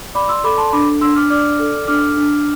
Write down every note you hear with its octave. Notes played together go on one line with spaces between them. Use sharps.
D5 B5 D6
C6 E6
A4 B5 D6
A5 C6
D4 B5 D6
D4 C6 E6
D6 F6
D5 D6 F6
A4
D4 D6 F6
D4